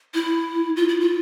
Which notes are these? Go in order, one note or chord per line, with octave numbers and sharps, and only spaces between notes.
E4
F4
E4
F4